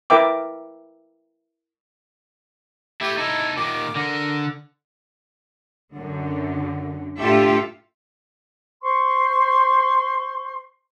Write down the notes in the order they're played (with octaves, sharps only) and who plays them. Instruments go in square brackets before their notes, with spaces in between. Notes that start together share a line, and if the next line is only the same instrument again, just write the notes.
[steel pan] E4 A#4 B4 E5 G5 D6
[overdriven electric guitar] A3 E4 [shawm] G4
[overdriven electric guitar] D#4 A4 [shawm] E4
[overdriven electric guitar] A#2 D#3 [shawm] D6
[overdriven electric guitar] D3 [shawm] A#4
[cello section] F#2 D3
A2 D4 F4 G4 A4 E5
[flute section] C5 C6 C#6